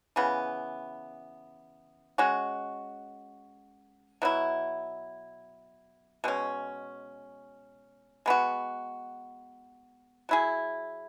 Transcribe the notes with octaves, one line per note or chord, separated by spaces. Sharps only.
C#3 E3 B3
G#3 C#4 F#4
B2 F#3 E4
B2 G#3 C#4
G#3 B3 F#4
F#3 E4 G#4